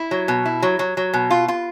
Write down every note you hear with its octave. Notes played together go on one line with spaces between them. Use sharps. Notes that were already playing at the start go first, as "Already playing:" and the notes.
Already playing: E4
F#3
B2
E4
F#3
F#3
F#3
B2
F4
F4